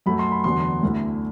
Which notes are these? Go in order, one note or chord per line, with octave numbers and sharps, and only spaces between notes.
F#2 F#3 A3 B5
C6
B5
E2 D3 F#3 B3 C6
D2 D3 A3 E4